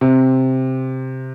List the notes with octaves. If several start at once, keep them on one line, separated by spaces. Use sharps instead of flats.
C3